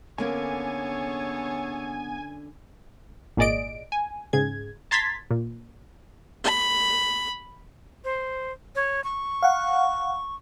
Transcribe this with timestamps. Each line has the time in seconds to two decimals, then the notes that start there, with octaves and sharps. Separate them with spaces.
0.18 D3 A#3 B3 C#4 G#4 A4 C#5 G#5
3.37 G#1 A#2 G#4 D5 D#5 D7
3.92 G#5
4.33 G#2 C#3 G#4 G#6
4.91 A5 A#5 C6 G#6 A6 B6
5.31 A#2
6.44 B5
8.04 C5
8.75 C#5
9.04 C#6
9.43 F5 F#5